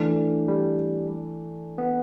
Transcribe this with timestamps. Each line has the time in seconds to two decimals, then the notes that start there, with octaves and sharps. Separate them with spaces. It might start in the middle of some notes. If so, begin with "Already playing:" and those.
Already playing: E3 A3 D4
0.48 G3
1.78 B3